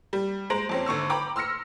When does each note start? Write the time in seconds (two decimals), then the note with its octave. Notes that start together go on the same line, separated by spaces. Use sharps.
0.13 G3
0.50 G#3 C5 A#5 A#6 D7 F#7
0.69 F2 C4 C#4
0.86 G#1 D3 C#6 E6
1.10 G5 A#5 B5 D6
1.36 C6 E6 F6 A#6 C#7